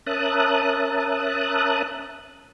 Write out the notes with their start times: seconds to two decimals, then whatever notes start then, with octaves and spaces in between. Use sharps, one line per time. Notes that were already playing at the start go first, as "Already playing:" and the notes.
0.06 C#4 A#4 E5 A5 D#6 F#6